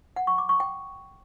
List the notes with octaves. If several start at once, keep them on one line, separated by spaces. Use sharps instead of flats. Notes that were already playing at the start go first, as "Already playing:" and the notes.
F#5
C#6
D6
C#6
G5